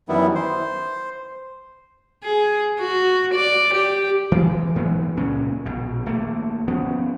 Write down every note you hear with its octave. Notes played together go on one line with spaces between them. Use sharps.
F#2 D#3 E3 G3 B3 E4
C5
G#4
F#4
D5
G4
E3 F3 G#3
G#2 E3 F#3 B3
C#2 A#2 C#4
A#1 B2
G#1 A3 A#3
F3 B3 C#4